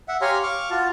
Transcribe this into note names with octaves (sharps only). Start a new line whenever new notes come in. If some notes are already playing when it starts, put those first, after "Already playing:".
E5 F#5
G4 C#5 F5 G#5 A#5 C6
F5 C#6 D6
F4 F#4 F5 A5